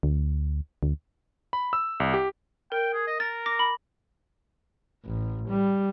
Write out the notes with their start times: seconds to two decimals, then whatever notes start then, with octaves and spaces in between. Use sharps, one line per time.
0.03 D2
0.83 D2
1.53 B5
1.73 E6
2.00 C2
2.14 G4
2.72 A#4 G5
2.93 G#4
3.07 D#5
3.20 A#4 A6
3.46 D6 A#6
3.59 B5
5.05 A1
5.49 G3